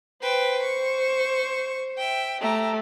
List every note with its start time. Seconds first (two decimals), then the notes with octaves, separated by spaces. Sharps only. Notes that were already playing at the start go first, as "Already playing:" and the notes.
0.22 B4 C5 G5
0.63 C#6
1.97 E5 G5
2.41 A3 G4 A#5